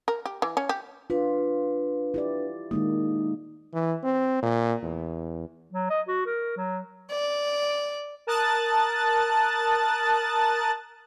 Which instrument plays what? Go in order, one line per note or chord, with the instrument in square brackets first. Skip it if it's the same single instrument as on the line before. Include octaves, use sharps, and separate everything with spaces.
[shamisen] A#4
G4
E3
C#4
G4
[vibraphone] D4 B4 [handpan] F4
[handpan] E4 G4 D5
[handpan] D#3 G#3 A#3 [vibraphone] D#4
[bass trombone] E3
C4
A#2
E2
[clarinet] F#3
D#5
F#4
A#4
F#3
[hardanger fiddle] D5
[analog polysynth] A#4 A5 D#6 F#6 A6